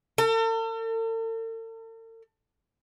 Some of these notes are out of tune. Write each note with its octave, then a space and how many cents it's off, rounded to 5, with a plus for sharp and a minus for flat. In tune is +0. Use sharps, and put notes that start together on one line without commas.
A4 +45